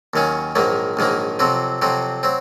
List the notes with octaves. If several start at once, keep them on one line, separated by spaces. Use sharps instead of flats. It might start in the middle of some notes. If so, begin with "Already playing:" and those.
D#2 D#3 F#3 C#4
A#1 G#2 D#3 F#3 A#3
A#1 G#2 D#3 F#3 A#3
F2 C3 F#3 C4
F2 C3 F#3 C4
F#3 C4